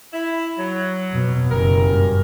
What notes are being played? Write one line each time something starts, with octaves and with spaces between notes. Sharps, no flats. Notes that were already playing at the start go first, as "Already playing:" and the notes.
E4
F#3
F2 B2
F#1 G3 C#4 A#4
G2